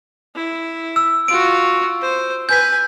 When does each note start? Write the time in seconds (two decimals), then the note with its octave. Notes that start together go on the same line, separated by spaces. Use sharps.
0.36 E4
0.96 E6
1.28 F4 F#4 D7
2.02 C5
2.49 B4 G#5 G6 B6